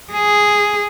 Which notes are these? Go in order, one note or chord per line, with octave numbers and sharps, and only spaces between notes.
G#4